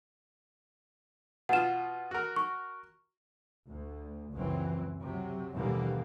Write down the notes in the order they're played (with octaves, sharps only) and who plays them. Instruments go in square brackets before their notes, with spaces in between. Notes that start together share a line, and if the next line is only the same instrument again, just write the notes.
[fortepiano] B2 F4 [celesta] F#5 E7
[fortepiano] F#4 A#4
[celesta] C#6
[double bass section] D2
F#1 C#2 F#2 E3 F#3 C4
C3 F#3
D#2 B2 D3 E3 G3 A#3